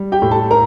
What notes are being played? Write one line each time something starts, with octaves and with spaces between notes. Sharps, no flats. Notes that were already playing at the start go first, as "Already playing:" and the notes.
Already playing: G3
G4 G5
A2
A4 A5
A#4 A#5